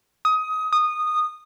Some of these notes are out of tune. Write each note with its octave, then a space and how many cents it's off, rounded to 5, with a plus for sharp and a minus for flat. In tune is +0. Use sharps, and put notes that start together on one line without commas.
D#6 +20
D#6 -15